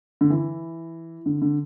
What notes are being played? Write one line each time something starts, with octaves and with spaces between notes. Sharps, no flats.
D3
E3
D3
D3